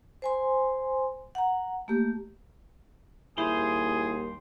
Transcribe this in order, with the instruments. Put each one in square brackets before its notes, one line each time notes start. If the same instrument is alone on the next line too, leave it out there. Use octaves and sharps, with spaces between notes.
[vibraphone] C5 G#5 C6
F#5 A#5
A3 A#3 G4
[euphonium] D#2 [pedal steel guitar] G3 C5 [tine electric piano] E4 [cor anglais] G#4